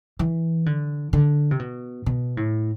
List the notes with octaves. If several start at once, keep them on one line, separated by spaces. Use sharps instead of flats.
E3
D3
D3
C3
B2
B2
A2